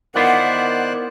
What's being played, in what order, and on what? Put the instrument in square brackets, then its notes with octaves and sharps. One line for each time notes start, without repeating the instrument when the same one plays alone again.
[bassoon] D#3 [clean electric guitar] B3 E4 F4 [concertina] C5 D5 F#6 [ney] F#5